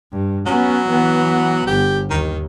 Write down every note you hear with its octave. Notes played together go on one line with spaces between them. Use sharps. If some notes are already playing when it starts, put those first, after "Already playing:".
G2
F#3 B3 C#4
E3 B3
G1 G4
D#2 D#3